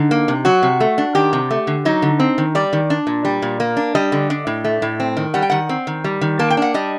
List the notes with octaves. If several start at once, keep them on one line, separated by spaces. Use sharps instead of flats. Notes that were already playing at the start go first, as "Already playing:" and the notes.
Already playing: D3 D#4
A#3
C3
F#3 F#4
C3
A3
D4
D#3 G4
C3
A3
D3
F#3 D#4
D3
C4
D#3
G3 D5
D#3
D4
A#2
G3
A#2
A#3
D4
G3 D#5
D3
D4
A2
A3
A2
C4
D#3
G3 F#5
G5
D#3 F#5
C4
D#3
G3
D#3
A#3 A5
G5
D4 F#5
G3 D#5